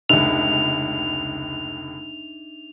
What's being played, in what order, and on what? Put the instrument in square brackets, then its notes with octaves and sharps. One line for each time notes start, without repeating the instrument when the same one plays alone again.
[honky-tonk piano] F1 C#2 [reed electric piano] D4 D#4 E5 [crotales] F7